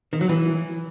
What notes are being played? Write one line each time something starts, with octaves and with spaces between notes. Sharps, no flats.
D#3
F#3
E3